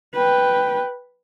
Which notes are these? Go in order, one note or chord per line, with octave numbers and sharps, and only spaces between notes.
B4 G5